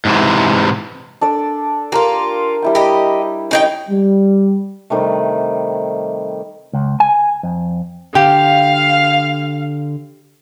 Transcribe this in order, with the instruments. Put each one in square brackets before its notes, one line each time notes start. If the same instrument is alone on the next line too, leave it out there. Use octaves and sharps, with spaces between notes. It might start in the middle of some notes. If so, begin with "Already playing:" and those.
[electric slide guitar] G#2 C3 E3
[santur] D4 A4 D5
[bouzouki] A#3 F4 [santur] G4 A#4
[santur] G3 E4 G5
[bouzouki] G4 D#5
C#4 D#4 G5
[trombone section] G3
[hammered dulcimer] C3 D#3 G3 A3
[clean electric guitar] C#2
G#5
F2
[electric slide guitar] D3 [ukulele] G4 [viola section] F5